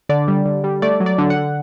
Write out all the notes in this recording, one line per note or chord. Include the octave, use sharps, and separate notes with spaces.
D3 D5
G3
D3
G3
A3 D5
F#3
D5
D3
F#5
D3